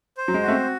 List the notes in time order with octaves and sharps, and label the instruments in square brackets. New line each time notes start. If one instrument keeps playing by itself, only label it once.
[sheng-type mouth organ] C5
[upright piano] F#3
G#3
[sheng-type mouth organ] F#4
[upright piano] A3
C4